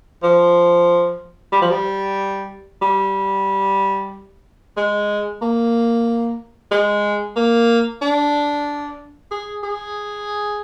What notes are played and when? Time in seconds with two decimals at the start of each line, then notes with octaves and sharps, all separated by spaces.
0.23 F3
1.52 G3
1.62 F3
1.71 G3
2.82 G3
4.77 G#3
5.42 A#3
6.71 G#3
7.36 A#3
8.01 D4
9.31 G#4
9.63 G#4